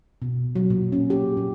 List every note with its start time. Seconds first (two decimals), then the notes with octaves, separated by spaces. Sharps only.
0.22 B2
0.56 F#3
0.70 A#2
0.92 C#4
1.10 G4
1.37 A#2